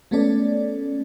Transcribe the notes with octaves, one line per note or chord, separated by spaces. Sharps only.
G#3 A3 B3 C#4 A4 D5